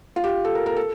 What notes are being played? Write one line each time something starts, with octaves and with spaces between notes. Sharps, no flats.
F4
G4
A4
A#4
A#4
A4